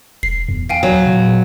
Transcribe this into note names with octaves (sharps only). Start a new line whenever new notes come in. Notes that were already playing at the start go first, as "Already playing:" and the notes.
E1 C7
E2
F5 G5 G#5
F#3
A#2